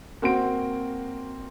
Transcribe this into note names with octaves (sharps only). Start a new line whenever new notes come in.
A#3 C4 F#4 C6 D7